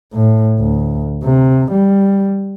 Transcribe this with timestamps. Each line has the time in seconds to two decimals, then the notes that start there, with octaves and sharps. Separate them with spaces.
0.14 A2
0.59 D2
1.23 C3
1.72 G3